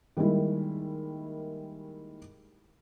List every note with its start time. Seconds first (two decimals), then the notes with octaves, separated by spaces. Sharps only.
0.17 D#3 G3 G#3 A#3 E4